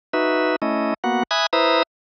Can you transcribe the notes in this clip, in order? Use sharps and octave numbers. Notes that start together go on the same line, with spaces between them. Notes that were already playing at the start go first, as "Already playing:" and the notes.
D#4 F#4 B4 E5
A3 C#4 E4 D#5
A#3 B3 F#4 F#5
E5 G#5 B5 D#6 F#6 G#6
E4 B4 C5 E5 A#5 D#6